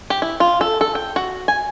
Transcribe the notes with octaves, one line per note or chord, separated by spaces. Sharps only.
G4
E4
F4
A4
A4
G5
F#4
G#5